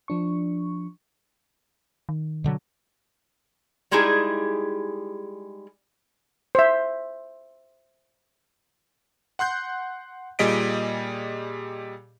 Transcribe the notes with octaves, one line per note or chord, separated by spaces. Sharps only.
F3 D4 C#6
D#3
B2 D3 F#3
G3 G#3 D#4 E4 G4 G#4
C5 E5
F#5 C6 F#6 G6
A#2 G3 G#4 D#5 B6 D7